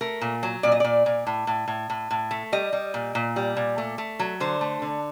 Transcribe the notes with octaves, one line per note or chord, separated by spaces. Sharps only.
A3 A#4
A#2
F#3
A#2 D5
D#5
A#2 D5
A#2
A2
A2
A2
A2
A2
A3
G3 D#5
G3
A#2
A#2
G3
A#2
A3
A3
F#3
D3 C5
A3
D3